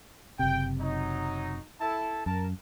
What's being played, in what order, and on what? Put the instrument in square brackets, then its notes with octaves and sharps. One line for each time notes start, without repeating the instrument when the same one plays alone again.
[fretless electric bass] F#1 C3 [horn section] G5
[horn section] F#3 D#4
E4 A4 A5
[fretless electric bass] F#2 [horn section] A#4 A5